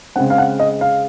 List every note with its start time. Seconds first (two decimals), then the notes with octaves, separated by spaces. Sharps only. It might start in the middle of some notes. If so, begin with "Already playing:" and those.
0.16 C#3 G#3 C4 F#5
0.30 F5
0.38 F#5
0.60 D#5
0.81 F5